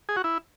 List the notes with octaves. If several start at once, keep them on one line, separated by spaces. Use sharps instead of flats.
G#4
F#4
E4